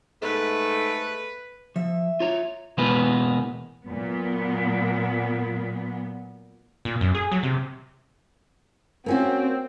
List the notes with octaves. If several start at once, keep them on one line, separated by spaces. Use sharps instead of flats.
G#2 A3 B4
F3 E5
F4 C#5 A#5
B2 E3 G#3 A#3 B3 B4
A#2 F#3 B3
A#2
F#2
G#4
F#3
C3
A#3 C4 C#4 F#4